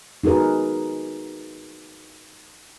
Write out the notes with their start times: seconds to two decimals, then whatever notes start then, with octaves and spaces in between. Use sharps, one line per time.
0.24 D#4 F#4 G#4 A#4 B4